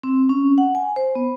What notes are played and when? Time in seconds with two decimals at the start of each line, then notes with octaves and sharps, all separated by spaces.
0.03 C4
0.29 C#4
0.58 F#5
0.75 G#5
0.96 C5
1.15 B3